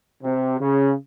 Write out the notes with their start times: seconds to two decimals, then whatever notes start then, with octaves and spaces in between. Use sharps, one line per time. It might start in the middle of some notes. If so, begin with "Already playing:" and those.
0.22 C3
0.60 C#3